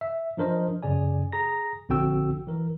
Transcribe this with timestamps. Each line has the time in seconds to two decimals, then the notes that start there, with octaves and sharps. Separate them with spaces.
0.01 E5
0.37 F3 D4 A#4 C5 D#5
0.83 F#2 C#3 G#4 D5 G#5
1.32 G#4 A#5 A#6
1.89 A#1 D3 C4 F#4 G5 E6
2.47 E3 A#4